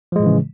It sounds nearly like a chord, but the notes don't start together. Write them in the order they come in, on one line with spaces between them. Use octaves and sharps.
F3 G#3 A2 E3 C#3